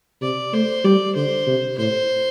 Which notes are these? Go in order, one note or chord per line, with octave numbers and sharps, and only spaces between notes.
C3 D5
A3 C5
G3 D5
D3 C5
C3
A2 C5